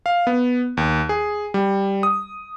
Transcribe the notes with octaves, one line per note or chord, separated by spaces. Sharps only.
F5
B3
D#2
G#4
G3
D#6